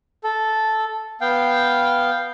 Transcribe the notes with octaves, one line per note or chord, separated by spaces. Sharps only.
A4
B3 F5 G5